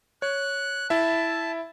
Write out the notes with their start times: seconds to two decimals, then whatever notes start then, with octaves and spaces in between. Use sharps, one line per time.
0.22 C#5 F#6
0.90 E4 E5 A5